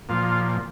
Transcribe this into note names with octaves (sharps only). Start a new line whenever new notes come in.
A#2 F3 F4